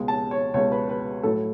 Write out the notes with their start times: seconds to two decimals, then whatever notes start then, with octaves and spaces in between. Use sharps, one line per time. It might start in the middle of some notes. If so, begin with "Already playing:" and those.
Already playing: C#2 B2 G#3
0.08 A5
0.31 C#5
0.54 C#2 B2 G#3 C#5
0.72 B4
0.89 B4
1.23 A2 F#3 A4